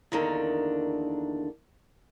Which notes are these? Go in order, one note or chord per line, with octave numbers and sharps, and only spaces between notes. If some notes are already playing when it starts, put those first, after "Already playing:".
E2 D3 D#3 A#3 D4